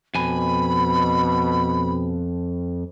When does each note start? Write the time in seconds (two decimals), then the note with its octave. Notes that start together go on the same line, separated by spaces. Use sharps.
0.15 F2 B2 G#5 B5